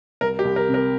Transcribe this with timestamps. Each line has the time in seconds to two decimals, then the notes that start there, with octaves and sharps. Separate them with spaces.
0.21 C2 A#4
0.39 G4
0.45 C2
0.56 A#4
0.69 C3
0.74 A#4